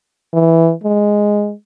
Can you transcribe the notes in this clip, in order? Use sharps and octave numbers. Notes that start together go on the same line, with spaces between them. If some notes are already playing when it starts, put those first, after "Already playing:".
E3
G#3